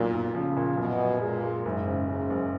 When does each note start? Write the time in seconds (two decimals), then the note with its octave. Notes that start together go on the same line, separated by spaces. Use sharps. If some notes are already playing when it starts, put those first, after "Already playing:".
Already playing: B1 A#2
0.13 B1
0.35 C#3 F3
0.57 A#2
0.77 F#2 B2
1.00 F#2
1.21 A#2 G#3
1.44 G#3
1.65 F#1 G#2
1.86 C#3
2.08 G#2 C#3
2.30 F#1